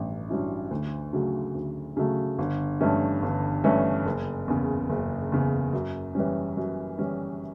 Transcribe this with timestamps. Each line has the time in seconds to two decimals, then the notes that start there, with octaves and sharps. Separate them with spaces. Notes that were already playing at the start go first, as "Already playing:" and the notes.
Already playing: A1 G2 C#4
0.29 G2 F#3 C#4 E4
0.71 D2
1.13 C#3 F#3 A3
1.55 D2
1.97 C#3 F#3 A3
2.38 G1
2.81 G2 E3 A3 C#4
3.22 G1
3.64 G2 E3 A3 C#4
4.06 F#1
4.48 E2 C#3
4.90 F#1
5.32 E2 C#3
5.73 F#2
6.15 E3 G3 C#4
6.57 F#2
6.99 E3 G3 C#4